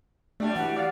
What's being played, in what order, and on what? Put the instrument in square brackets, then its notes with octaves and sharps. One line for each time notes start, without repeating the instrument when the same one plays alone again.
[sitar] F#3 G3 D4 [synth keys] A3
[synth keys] E3 [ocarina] F#5
[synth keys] D5 F5